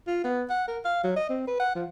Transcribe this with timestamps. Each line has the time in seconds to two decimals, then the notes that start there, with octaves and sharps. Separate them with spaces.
0.07 F4
0.24 B3
0.49 F#5
0.68 A#4
0.85 F5
1.04 F#3
1.16 D#5
1.29 C4
1.47 B4
1.60 F#5
1.75 F3